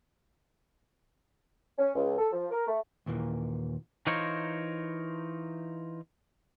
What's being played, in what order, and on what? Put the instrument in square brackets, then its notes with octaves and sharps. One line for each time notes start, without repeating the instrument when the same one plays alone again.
[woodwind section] C#4
C#2
A4
F3
A#4
A3
[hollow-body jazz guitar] D#2 A#2 E3 A#3
[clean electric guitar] E3 D#4 F4 A#4 C5 C#5